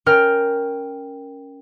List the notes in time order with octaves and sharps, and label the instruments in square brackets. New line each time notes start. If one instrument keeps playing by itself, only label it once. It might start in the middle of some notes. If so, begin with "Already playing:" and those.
[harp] C#4 A#4 G5 F6